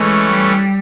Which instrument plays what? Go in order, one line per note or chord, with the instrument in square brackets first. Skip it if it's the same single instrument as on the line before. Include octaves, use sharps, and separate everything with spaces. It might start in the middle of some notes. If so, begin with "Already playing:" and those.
Already playing: [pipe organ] E3 A3 C#4 [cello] G#3
[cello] G3